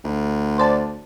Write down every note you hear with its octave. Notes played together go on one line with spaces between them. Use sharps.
D2
C5 D5 A5